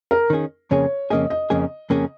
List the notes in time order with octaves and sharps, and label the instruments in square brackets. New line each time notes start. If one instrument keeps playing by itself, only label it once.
[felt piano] A#4
[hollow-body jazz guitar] D#3 C#4 G#4
[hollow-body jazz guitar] F2 C#3 A#3 C#4 G#4 [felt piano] C#5
[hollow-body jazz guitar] F2 C#3 A#3 C#4 G#4 [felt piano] D#5
[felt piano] D#5
[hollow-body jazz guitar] F2 C#3 A#3 C#4 G#4
F2 C#3 A#3 C#4 G#4